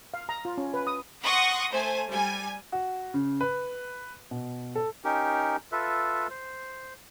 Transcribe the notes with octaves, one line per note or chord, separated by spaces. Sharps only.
F5
A#5
F4
C#4
B4
D#6
F#5 C6 C#6 D#6 A#6
A3 C5 G#5
G3 G#5
F#4
C#3
B4
B2
A4
C#4 D#4 G4 A#4
F4 A4 B4 E5
C5